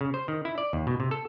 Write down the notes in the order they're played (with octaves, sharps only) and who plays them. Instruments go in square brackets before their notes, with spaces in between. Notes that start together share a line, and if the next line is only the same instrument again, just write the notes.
[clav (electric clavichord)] C#3
C5
D#3
E4
D5
D#2
B2
C3
A4